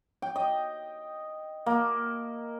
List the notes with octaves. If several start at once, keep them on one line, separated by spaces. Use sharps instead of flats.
G5
D#5
A#3